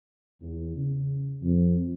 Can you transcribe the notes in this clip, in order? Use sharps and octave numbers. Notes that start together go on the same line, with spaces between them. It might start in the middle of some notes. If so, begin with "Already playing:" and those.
E2
C#3
F2